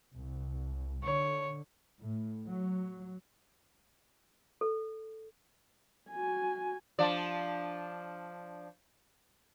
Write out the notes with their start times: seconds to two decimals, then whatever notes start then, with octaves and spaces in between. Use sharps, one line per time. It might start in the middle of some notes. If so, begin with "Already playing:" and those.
0.14 C2
1.03 D3 C#5
2.00 A2
2.48 F#3
4.61 A4
6.10 F#4 G#5
6.99 F3 D4 D5